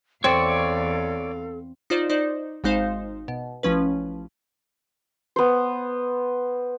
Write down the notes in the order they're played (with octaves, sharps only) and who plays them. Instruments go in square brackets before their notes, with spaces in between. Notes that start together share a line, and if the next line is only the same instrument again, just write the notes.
[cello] E2 F5 [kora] C4 [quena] A4 [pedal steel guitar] C#5 D5 C#6
[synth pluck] D#4 F4 C5 D5
D#4 C5 D5
G#1 G#3 D#4 C5 F5
B2
A1 F3 C#4 B4
[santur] B3 C5